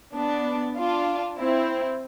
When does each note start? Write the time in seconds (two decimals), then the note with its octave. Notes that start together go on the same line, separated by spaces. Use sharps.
0.14 B3 D4
0.76 D4 F4
1.38 C4 E4